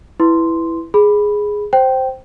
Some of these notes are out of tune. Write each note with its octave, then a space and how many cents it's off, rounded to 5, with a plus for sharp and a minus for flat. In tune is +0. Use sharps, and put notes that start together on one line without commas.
E4 +0 B4 +0 C6 -5
G#4 +0 B5 +0
C5 +0 G5 -15